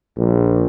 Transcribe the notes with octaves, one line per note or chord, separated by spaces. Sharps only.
A#1